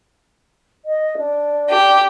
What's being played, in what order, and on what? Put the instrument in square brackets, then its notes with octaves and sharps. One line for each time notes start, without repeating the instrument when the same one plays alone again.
[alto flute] D#5
D4
[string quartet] G4